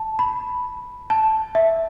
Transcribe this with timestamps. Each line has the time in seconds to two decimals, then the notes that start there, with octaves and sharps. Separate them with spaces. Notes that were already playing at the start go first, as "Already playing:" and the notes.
Already playing: A5
0.19 B5
1.10 A5
1.55 E5